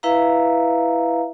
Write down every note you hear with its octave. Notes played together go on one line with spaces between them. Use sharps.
E4 B4 E5 F5 A#5